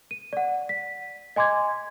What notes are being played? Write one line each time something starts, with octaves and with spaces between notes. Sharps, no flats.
D#7
D5 F#5
B6
D#5 G#5 C6 D6 G#6